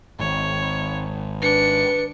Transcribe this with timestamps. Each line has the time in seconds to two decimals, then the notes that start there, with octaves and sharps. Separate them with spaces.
0.20 G#1 C#5
1.42 D4 B4 C#7